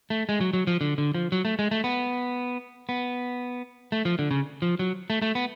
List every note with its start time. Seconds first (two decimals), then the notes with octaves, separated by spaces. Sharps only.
0.10 A3
0.29 G#3
0.41 F#3
0.53 F#3
0.67 F3
0.81 D3
0.98 D3
1.14 F3
1.32 F#3
1.45 A3
1.59 G#3
1.71 A3
1.84 B3
2.89 B3
3.92 A3
4.05 F3
4.19 D3
4.31 C#3
4.62 F3
4.79 F#3
5.10 A3
5.22 A3
5.35 B3